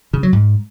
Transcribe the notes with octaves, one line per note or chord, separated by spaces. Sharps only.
C#3
F#3
G#2